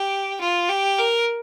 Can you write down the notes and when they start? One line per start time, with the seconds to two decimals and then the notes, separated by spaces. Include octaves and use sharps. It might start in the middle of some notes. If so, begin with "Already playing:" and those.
Already playing: G4
0.41 F4
0.69 G4
0.98 A#4